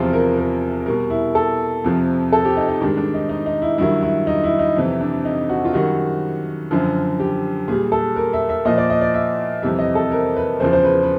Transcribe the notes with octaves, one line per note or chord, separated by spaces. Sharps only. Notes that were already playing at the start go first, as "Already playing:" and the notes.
Already playing: E2 C3 F3 F4
A#4
A#4
B2 G3 A#4
E4
A4
F2 C3 F3
A4
G4
D#4
D#4
G#2 D#3 G3 D4
D4
D#4
D#4
D#4
E4
G2 D#3 F#3 E4
E4
D#4
E4
D#4
F2 C3 E3
D4
D#4
F#4
F4
F#2 D#3 G3 F#4
F#2 D3 F3
G4
A#2 G3 G#4
A4
A#4
E5
E5
A#2 F3 D#5
D5
D#5
D5
E5
F2 C3 E3 G3 E5
D#5
A4
A#4
B4
E2 C#3 F3 C5
C5
B4
B4